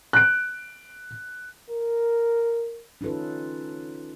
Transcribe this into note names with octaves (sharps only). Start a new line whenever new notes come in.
F#6 D7
A#4
C#4 D#4 F4 A4 B4